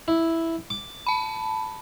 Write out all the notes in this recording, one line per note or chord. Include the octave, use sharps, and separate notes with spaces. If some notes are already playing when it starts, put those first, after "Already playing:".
E4
D6
A5 B5